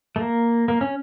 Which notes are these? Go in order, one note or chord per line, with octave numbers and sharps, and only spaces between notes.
A3
A#3
A#3
C#4